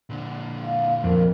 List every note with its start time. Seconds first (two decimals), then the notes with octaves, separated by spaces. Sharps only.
0.10 A#2 D3
0.63 F5
1.04 F2 A#4